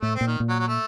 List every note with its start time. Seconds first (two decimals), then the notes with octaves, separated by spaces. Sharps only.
0.02 A2 A3
0.15 C4
0.21 A#2
0.27 D#3
0.40 A#2
0.49 F#3
0.59 F#3
0.67 A3